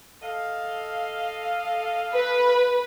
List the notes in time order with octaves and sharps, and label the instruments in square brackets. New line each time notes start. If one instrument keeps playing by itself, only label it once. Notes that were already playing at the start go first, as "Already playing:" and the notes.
[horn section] A4 D#5 F5
[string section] B4